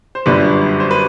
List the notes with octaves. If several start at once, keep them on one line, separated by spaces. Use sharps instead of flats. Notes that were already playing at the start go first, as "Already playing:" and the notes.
C5
G1 F#2 D3 G3 D4 B4
C5
B4